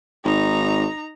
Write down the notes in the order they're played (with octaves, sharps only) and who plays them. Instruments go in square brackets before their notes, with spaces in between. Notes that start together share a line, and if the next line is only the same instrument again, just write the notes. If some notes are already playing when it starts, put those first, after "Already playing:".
[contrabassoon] G#1 [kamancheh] D#4 A#5